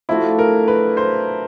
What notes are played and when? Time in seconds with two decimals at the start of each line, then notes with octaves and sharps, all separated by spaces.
0.09 F3 A3 D4 E4 F#4
0.39 A#4
0.68 B4
0.97 C5